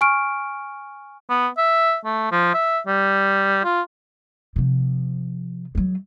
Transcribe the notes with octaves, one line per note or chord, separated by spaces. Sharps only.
G#5 C#6 F6 D7
B3
E5
A3
F3
E5
G3
F4
C3 F3
F#3 G#3